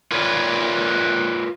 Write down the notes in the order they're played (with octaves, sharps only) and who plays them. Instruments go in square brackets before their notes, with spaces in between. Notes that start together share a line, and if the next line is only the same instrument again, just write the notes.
[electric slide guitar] F4 A#4 B4 C#5 D5